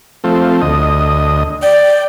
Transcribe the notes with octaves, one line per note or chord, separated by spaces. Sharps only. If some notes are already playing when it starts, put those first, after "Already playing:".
F3 A3 C4
D2 D#5
D5 G5